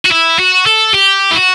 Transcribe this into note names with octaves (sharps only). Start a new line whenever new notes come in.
F#4
E4
F#4
A4
G4
E4
F#4